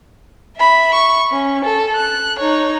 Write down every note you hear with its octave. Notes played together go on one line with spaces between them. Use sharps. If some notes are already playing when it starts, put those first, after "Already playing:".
E5 B5
C#6
C#4
A4
F#6
D#4 C#5